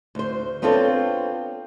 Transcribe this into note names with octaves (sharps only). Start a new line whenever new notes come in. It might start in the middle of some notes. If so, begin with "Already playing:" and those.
D2 C5
B3 C4 D4 F4 A4 C#5